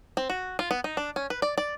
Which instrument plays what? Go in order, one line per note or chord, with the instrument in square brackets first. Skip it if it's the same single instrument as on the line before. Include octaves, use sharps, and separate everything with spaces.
[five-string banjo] C4
F#4
F4
B3
D#4
D4
C#4
B4
D5
D5